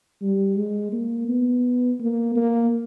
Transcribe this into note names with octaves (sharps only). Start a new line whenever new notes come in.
G3
G#3
A#3
B3
A#3
A#3